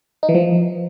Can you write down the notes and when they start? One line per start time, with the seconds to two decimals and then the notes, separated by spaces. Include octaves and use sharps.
0.23 D#4
0.29 E3
0.34 F3